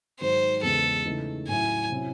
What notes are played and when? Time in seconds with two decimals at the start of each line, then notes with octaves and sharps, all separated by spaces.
0.21 G#2 D#3 F#3 C5
0.63 E2 C#3 G#3 A4
1.06 C#3 E3 A3 D#4
1.48 A2 F#3 C#4 E4 G#5
1.90 C3 F#3 C#4 E4